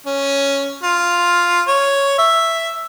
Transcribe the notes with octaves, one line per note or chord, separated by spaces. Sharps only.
C#4
F4
C#5
E5